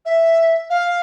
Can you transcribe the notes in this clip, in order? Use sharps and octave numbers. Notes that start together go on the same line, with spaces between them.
E5
F5